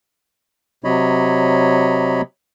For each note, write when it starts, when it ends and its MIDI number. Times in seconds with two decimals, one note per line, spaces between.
0.84 2.22 48
0.84 2.22 54
0.84 2.22 73
0.84 2.22 75
0.84 2.22 83